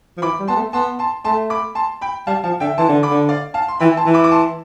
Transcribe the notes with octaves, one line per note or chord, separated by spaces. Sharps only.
F3
E3 B5 D6
G3
B3 A5 C6
A3
B3 A5 C6
A5 C6
A3 A5 C6
B5 D6
A5 C6
G5 B5
G3 F5 A5
F3 F5 A5
D3 E5 G5
E3 A5 C6
D3
B5 D6
D3
D5 F5
F5 A5
C6
E3 G5 B5
A5 C6
E3
B5 D6
D6
A5 C6